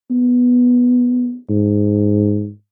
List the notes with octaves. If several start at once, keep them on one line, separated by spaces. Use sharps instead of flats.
B3
G#2